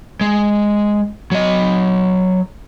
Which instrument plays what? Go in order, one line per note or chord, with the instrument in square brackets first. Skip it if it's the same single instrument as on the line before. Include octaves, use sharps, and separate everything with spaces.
[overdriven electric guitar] G#3
F#3 D#5